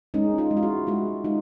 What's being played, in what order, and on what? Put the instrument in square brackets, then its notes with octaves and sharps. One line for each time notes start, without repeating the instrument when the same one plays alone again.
[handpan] G#3 C#4 D#4
D#4 F4
G#3
F4
E4 F#4
G#3 E4 F#4
G#3 D#4 F4